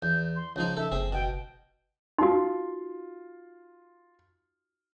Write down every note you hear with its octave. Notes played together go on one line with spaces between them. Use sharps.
E2 G6
C6
C#2 F3 D#4 G6
A4 E5
F#1 C4 G#4
B2 G5
D#4 F4 F#4 C6